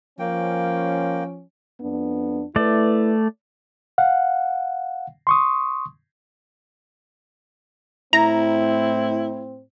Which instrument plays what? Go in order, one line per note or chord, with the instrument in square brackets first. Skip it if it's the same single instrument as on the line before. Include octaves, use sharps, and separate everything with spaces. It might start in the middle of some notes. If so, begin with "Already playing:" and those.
[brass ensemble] F3 C#4 [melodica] A#3 G5
[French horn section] F2 B3 D4
[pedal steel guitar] A3 D5 [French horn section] E4 B4
[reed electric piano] F5 F#5
C6 C#6 D#6
[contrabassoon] A2 [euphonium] C4 [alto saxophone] E4 [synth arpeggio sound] A#5